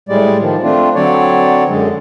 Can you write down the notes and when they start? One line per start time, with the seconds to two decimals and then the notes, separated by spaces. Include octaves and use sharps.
0.09 A2 G3 G#3 D5
0.41 D#3 F3
0.63 A3 C4 D4 F4
0.95 D3 F#3 C4 C#5 D5
1.69 F#2 D3 G#3